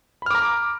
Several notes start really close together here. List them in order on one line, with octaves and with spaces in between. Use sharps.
B5 F6 D6 A#5